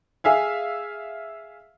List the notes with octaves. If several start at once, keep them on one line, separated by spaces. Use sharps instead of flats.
G#4 E5 F5 G#5